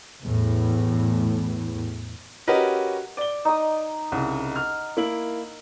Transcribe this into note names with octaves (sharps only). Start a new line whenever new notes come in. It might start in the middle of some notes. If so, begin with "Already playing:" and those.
E2 A2
C#4 F#4 G4 A#4 B4 D#5
D5 G7
D#4 D#6
C2 C#3 F#5
F6
A#3 E4 F#7